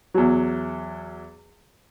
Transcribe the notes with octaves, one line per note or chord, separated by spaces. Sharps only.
E2 F#3